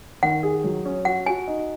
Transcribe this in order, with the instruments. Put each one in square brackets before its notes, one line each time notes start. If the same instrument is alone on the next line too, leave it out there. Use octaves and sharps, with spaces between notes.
[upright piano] D#3 [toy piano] F#5
[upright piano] G#4
F#3
C#4
[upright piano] F#4 [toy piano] F#5
[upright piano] F#4 [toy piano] G#5
[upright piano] D#4